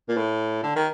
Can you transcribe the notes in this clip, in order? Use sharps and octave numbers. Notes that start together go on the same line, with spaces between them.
A#2
A2
D3
D#3